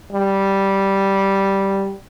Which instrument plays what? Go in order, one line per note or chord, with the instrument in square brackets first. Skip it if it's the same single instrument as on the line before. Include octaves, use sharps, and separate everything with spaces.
[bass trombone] G3